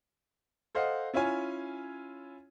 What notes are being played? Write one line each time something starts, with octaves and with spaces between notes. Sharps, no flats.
A4 C5 D#5 F5 F#5
C#4 E4 F4 C#5 G#5